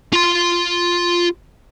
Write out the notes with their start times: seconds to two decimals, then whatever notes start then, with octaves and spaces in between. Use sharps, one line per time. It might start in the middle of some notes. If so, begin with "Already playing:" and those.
0.13 F4 C6